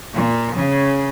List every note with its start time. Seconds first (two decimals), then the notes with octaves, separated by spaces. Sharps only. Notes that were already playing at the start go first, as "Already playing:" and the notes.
0.13 A#2
0.56 C#3